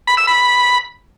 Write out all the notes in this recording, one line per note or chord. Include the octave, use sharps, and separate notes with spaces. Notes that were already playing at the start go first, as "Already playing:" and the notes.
B5
E6
B5